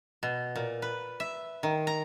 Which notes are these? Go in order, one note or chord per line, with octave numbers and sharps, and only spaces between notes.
B2
A#2
B4
E5
D#3
A#5